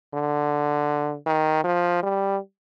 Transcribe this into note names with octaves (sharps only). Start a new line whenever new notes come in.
D3
D#3
F3
G3